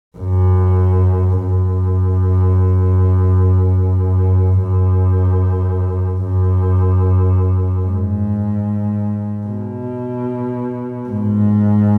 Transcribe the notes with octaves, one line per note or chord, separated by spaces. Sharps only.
F#2
F#2
F#2
F#2
G#2
B2
G#2